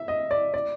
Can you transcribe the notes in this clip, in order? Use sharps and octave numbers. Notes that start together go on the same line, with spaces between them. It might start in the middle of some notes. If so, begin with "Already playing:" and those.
Already playing: E5
D#5
D5
D5